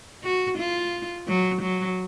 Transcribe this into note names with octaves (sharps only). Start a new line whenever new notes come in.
F#4
F4
F#3
F#3